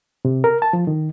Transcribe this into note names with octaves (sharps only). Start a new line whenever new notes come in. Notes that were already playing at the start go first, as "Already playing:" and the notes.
C3
A#4
A5
F3
D#3